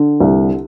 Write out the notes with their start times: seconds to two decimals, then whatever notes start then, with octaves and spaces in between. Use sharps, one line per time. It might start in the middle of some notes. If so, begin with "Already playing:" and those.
Already playing: D3
0.20 C2